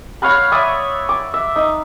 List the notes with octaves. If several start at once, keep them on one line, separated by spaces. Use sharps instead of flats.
C#5 F5 F#5 B5
C#5 D5 E5 D#6
D6
E5
D#4